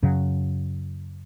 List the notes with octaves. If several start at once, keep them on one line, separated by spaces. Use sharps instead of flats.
F#2 C#3 F#3